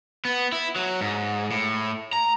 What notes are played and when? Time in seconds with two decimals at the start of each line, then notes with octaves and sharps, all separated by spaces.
0.25 B3
0.52 E4
0.76 F#3
1.01 G#2
1.51 A2
2.13 A#5